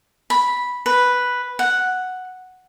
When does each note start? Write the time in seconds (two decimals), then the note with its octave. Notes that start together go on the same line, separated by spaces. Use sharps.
0.30 B5
0.86 B4
1.59 F#5